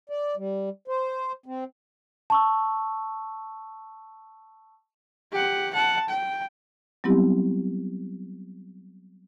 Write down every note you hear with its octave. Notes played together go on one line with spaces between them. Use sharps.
D5
G3
C5
C4
A5 C#6 E6
G4 F#5
F#5 A5
G5
F#3 G3 B3 C4 E4 G4